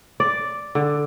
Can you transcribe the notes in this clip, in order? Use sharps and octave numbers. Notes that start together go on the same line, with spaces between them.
D5
D3